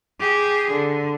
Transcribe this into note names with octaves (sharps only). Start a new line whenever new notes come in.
G4 G#4
D3